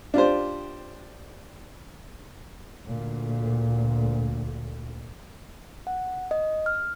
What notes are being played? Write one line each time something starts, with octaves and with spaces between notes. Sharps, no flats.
D4 F4 G4 C5
D2 A#2
F#5
D#5
F6